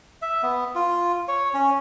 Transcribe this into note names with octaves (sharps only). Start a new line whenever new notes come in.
E5
B3
F4
C#5
C#4